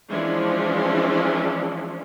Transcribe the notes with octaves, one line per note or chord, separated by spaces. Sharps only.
E3 F3 G#3 C#4 D4